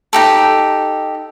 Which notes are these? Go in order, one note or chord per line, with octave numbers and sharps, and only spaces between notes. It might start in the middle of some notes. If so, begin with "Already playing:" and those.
D#4 G4 A4